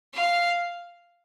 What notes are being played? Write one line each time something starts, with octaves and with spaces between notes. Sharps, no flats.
F5